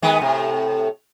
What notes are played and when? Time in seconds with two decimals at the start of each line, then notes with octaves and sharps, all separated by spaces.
0.02 D#3 G#3 B3
0.21 A2 C3